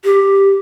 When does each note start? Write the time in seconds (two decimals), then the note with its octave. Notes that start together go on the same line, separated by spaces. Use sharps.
0.04 G4